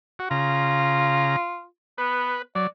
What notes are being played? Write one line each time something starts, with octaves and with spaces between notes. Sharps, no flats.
F#4
C#3 F4 A#5
B3 B4
F#3 D5